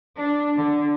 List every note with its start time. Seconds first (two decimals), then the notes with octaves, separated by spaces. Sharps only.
0.16 D4
0.56 D3